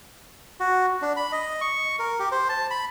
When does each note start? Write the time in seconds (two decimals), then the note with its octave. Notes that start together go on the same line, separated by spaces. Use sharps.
0.60 F#4
1.02 D4
1.17 B5
1.32 D#5
1.61 C#6
1.99 A#4
2.19 G4
2.32 C5
2.49 A5
2.71 B5